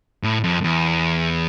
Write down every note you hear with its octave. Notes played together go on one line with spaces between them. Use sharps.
A2
F2
E2